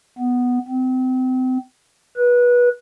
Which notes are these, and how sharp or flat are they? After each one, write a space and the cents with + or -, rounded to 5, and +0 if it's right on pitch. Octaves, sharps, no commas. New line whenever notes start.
B3 +0
C4 -30
B4 -20